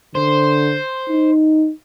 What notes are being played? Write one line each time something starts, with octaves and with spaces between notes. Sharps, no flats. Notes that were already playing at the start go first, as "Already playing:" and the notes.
D3 C5
D#4